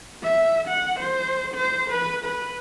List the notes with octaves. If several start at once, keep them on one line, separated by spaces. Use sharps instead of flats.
E5
F#5
C5
C5
B4
B4